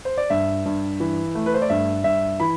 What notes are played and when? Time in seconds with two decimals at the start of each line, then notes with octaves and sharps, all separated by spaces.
0.05 C5
0.18 D5
0.30 G2 E5
0.66 G2
1.00 E3
1.35 A3
1.46 B4
1.54 C5
1.62 D5
1.70 G2 E5
2.04 G2 E5
2.40 E3 B5